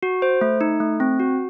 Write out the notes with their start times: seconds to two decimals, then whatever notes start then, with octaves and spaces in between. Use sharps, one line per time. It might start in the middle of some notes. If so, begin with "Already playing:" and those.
0.03 F#4
0.22 C5
0.41 A3
0.61 D#4
0.80 A3
1.00 C4
1.20 F#4